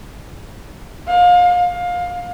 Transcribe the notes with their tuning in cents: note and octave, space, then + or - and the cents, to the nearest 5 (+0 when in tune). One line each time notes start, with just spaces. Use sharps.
F5 +30
F5 +25